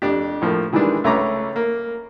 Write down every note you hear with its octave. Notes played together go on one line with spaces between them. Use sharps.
F2 D4 G4
A2 F3 A#3
D#3 E3 G3 G#3 D4
C#2 A3 C#4 B4 A#5 D6
A#3